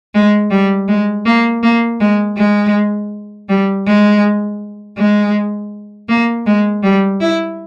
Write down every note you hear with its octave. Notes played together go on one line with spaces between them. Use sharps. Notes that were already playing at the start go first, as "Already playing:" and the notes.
G#3
G3
G#3
A#3
A#3
G#3
G#3
G3
G#3
G#3
A#3
G#3
G3
E4